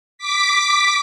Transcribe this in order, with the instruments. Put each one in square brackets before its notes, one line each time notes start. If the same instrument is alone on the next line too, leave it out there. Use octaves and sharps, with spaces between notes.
[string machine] D6 B6